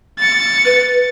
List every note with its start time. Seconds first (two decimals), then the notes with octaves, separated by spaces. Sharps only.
0.19 A6 C#7
0.65 B4